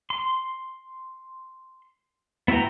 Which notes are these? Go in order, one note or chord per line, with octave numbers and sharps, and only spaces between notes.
C6
B3 E4 F#4 G5 A#5